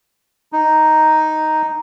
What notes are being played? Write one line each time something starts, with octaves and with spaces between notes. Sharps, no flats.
D#4